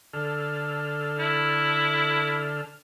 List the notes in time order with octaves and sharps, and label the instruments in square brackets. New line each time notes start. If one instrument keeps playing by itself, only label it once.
[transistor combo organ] D3 A4 F6
[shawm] E4